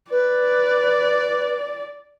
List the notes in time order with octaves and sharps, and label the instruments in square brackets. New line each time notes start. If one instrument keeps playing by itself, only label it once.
[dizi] B4 [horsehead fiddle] D5